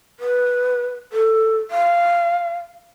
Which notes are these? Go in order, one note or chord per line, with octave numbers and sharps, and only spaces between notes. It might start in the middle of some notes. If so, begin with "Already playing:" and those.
B4
A4
F5